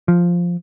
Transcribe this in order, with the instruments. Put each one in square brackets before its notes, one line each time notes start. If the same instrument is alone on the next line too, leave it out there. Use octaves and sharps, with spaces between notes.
[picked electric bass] F3